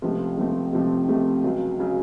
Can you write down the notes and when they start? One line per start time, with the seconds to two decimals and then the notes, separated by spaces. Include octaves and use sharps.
0.02 C#2 C3 F3 A3 C4
0.38 C#2 C3 F3 A3 C4
0.73 C#2 C3 F3 A3 C4
1.08 C#2 C3 F3 A3 C4
1.43 C#2 C#3 F#3
1.80 C#3 F#3